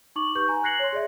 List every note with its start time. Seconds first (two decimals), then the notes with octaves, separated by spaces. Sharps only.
0.16 D#4 C#6 D6 F#7
0.35 G4 B4 C#6 G6
0.48 G#5 A#5
0.64 F#6 G#6 A#6 C7 C#7 F#7
0.79 C#5 C6
0.92 G#4 D5 E5